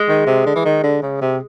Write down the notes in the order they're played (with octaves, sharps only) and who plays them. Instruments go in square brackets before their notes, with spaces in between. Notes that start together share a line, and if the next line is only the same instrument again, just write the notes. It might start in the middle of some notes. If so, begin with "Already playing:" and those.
Already playing: [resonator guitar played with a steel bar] G#3
[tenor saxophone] D#3
C3
D3
E3
D#3
D3
C#3
C3